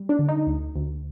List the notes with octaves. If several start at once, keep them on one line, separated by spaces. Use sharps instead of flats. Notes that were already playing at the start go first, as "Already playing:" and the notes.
Already playing: G3
D4
D3
D#4
D2
D2